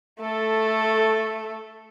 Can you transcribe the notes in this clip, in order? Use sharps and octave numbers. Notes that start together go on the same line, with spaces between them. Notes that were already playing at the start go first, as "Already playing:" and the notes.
A3 A4